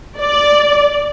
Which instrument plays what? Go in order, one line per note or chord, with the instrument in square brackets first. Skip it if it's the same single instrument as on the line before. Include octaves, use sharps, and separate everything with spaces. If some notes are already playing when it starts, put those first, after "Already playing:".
[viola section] D5